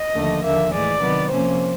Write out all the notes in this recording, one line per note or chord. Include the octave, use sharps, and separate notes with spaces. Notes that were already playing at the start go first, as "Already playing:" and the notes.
Already playing: D#5
D#2 D3 F3 A3
D#2 D3 F3 A#3 E5
A2 E3 G#3 D5
C3 D#3 F#3 B3
C3 F3 A#3 C#4 C5